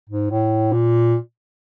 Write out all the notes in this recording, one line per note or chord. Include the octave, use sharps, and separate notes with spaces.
G#2
A2
A#2